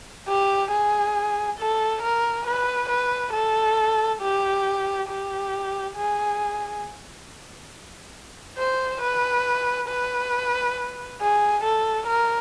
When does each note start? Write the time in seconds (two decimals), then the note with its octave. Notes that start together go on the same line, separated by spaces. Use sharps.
0.28 G4
0.71 G#4
1.59 A4
2.03 A#4
2.47 B4
2.90 B4
3.33 A4
4.22 G4
5.09 G4
5.96 G#4
8.58 C5
9.02 B4
9.89 B4
11.21 G#4
11.64 A4
12.07 A#4